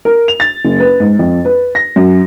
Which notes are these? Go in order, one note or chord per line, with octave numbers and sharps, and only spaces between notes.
A#4
F7
A6
F#1
B4
G#2
F2
B4
A#6
F#2